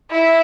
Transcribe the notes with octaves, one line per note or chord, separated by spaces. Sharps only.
E4